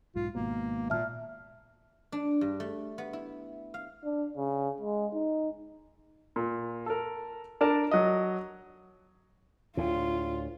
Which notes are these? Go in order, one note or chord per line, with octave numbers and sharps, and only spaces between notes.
B1 G#2 F4
G#1 G#2 B2 A#3
A#2 E5 A5 F6
D4
G2
A3
B3
E4
F5
D4
C#3
G#3
D#4
A#2
A4 A#4
D4 A#4 A5
F#3 D#5
D2 A2 F4